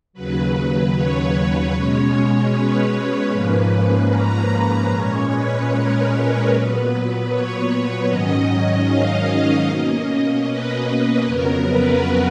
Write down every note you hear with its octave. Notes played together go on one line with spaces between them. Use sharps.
D#2 C#3 F#3 B4
C#5
B2 G#3 C#4 C#5
B4
G#2 F3 A#3 C#4 B4
A#5
A#2 G#3 C#4 C#5
B4
A#4
A#2 F#3 B3 B4
C#5
G#2 D#3 F#3 C#4 D#5
F5
B2 A#3 C#4 D#5
B4
F2 C#3 F#3 B3 A#4
B4